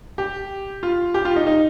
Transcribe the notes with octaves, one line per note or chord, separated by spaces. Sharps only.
G4
F4
G4
F4
D#4
D#4